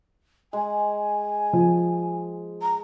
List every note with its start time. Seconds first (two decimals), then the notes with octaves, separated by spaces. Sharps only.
0.53 G#3 G#5
1.53 F3
2.62 A#5